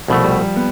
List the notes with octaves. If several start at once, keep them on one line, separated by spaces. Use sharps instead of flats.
C2 B2 F3 A3
G3
B3